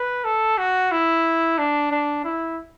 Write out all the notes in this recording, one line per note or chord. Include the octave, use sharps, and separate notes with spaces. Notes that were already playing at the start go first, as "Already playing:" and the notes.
Already playing: B4
A4
F#4
E4
D4
D4
E4